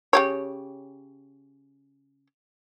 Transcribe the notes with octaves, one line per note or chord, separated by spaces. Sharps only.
C#3 G4 C#5